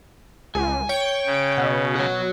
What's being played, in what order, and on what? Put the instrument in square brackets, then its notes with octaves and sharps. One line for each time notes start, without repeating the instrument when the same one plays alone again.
[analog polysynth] C#2 [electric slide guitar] G#5
[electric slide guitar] C#5 [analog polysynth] G5
[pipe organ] C#3
[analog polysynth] B2
[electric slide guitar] F#4 C#5